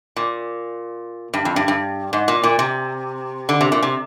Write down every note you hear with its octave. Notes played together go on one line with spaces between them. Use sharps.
A#2
G2
F2
G2
G2
G#2
A#2
A#2
C3
D3
C3
A#2
C3